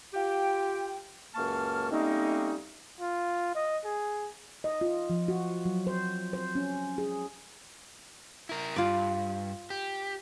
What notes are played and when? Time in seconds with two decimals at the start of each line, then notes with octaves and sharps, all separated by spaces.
0.14 F4 G4 G5
1.35 C#2 F#2 A#3 A5 C#6 F6
1.91 G3 A3 A#3 C4 C#4 D#4
3.01 F4
3.55 D#5
3.85 G#4
4.64 D#5
4.81 F4
5.10 F3
5.28 F#4
5.65 F#3
5.87 C5
6.33 C5
6.55 C#4
6.98 G#4
8.49 E4 A#4
8.76 G2 F4 D5
9.70 G4